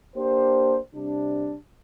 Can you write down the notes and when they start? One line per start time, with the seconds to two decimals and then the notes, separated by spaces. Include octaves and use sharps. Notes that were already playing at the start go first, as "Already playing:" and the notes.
0.16 A#3 D4 G4 C5
0.94 C3 G3 D4